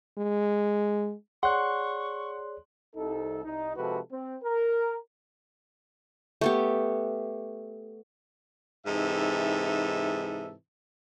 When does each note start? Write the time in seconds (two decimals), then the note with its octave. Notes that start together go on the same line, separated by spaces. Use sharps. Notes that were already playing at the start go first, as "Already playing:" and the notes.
0.18 G#3
1.43 G#4 C#5 D5 F#5 C6 C#6 F#6
2.96 C2 D#4 A4
3.44 C2 D#4
3.77 C3 F3 G#3 F#4 A4 B4
4.12 C4
4.44 A#4
6.41 A3 B3 G4
8.86 G#2 C3 E3 D#4 A4 E5